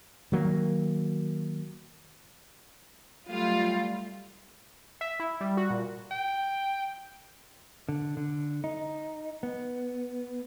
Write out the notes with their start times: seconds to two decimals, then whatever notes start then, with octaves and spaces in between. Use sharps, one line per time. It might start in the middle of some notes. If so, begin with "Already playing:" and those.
0.32 D#3 F#3 A#3
3.28 F#3 G3 A3 F4
5.01 E5
5.20 E4
5.41 G3
5.57 F#4
5.70 A#2
6.11 G5
7.89 D3
8.17 D3
8.64 D#4
9.43 B3